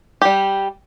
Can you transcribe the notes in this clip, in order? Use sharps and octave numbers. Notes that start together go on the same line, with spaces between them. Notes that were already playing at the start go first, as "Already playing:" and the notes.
G3 G4